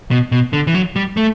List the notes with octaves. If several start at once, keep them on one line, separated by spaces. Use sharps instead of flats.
B2
B2
D3
E3
F#3
G3
A3